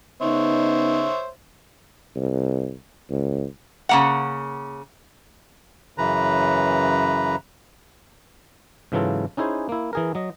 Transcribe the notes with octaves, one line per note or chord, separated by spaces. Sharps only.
C#3 B3 D#4 C5 C#5 E5
C2
C#2
C#3 A#3 F#5
F#2 C#3 E3 B4 A#5
G#2 C#3 E3 F#3 F4 A4
C#4 D#4 E4 G#4 C5
A#3 E4
E3 G#4 A#4
F#3 D#5